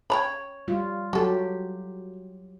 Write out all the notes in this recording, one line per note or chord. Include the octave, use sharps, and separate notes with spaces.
C#5 G5 A#5 B5
G3 F4
F#3 F#4 G4 A4